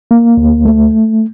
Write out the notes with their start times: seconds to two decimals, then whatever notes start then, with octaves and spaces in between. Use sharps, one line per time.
0.11 A#3
0.37 D2
0.65 A3